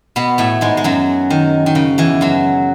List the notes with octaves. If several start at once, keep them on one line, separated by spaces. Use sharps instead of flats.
B2 B3
A2 A3
G#2 G#3
G#3
F#2 F#3
D#3
D#3
C#3
E2 E3
F#2 F#3